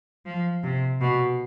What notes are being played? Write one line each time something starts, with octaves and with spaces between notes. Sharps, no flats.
F3
C3
B2